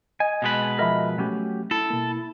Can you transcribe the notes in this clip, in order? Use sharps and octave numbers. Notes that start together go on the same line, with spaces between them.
D#5 G#5
B2 G#3 B4
F3 A#4 D#5 E5 B5
F#3 A3 C#4 G4
E4 A4
B2 A#3